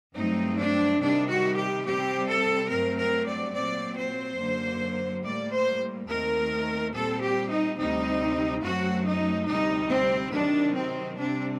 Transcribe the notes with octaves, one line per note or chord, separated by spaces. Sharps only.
G2 F#3 A3 C4 D#4
D4
C3 D#3 G3 D4
F#4
G4
C3 G3 C4 G4
A4
G2 F#3 A3 C4 A#4
A#4
D5
A#2 F#3 C4 D5
C5
F#2 D3 F#3 A#3
A2 G3 A#3 D5
C5
D#2 D#3 A3 C4 A#4
A#2 G3 C4 A4
G4
D#4
D2 C3 G3 C4 D#4
F#2 F#3 A3 C4 F#4
D#4
D2 C3 G3 D#4
C4
C3 D#3 F#3 D4
C4
C3 G3 C4 D4